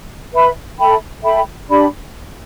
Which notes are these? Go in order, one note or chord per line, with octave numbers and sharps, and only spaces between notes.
B4 E5 B5
A4 E5 G5 B5
A4 E5 G5 B5
D4 G4 D5 B5